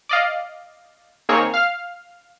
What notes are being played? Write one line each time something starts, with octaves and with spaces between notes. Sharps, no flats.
D5 D#5 F5
D#3 A#3 C4 G#4 C#5
F5 F6